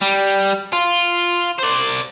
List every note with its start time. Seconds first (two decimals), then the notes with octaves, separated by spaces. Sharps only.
0.02 G3
0.73 F4
1.59 C5 D5